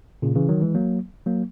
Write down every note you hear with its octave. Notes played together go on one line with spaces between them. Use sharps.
A#2 C#3
C#3 E3
D#3 F#3
E3 G#3
F#3 A#3
F#3 A#3